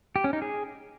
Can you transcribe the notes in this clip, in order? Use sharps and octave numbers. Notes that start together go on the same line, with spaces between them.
G4
C#4
D#4
G#4